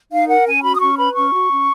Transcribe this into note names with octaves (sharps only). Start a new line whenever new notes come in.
D#4 F5
A#4 F#5
C#4 G#5
F#4 B5
D#6
C#4 C#6
B4 B5
C#4 C#6
F#4
C#4